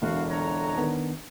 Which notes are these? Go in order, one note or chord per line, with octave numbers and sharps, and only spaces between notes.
E1 D3 F#4 F5
F2 C#5 A#5
D#3 B3 D4